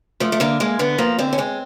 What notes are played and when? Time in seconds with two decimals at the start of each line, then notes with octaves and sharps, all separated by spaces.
0.20 F3 A3
0.32 A3
0.40 D3 A#3
0.60 G#3 A#3
0.79 D3 B3
0.98 F3 A#3
1.19 D3 C4
1.33 C#4
1.38 G#3 C4